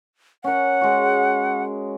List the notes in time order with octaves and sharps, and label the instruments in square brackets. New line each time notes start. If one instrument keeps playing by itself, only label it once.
[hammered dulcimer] C#4 A#4 [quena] F#5
[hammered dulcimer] G#3 F#4